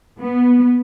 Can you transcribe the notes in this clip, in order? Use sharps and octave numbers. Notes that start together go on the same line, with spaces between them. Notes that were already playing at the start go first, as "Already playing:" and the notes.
B3